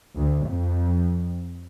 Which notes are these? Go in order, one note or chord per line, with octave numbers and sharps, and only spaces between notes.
D2
F2